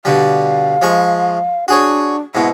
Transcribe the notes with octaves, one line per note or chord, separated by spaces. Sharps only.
B2 D3 G3 F5
F3 G#3 C#6
D4 F#4 G#4 C#5
G#2 B2 E4